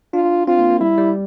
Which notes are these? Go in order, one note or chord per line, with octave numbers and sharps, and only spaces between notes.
D4 F4
C4 F4
A#3
A#3
G3 E4
G3